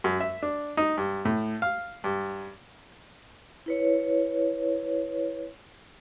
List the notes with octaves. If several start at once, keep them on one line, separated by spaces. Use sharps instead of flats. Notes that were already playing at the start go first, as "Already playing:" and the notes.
F#2
E5
D4
D#4
G2
A2
F5
G2
E4 B4 C#5